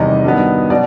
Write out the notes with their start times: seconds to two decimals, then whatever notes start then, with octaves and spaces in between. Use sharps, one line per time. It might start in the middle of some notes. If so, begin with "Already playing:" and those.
Already playing: E2 C3 D#3 G3 D#5
0.25 G2 D#3 F#3 B3
0.70 B2 F#3 D5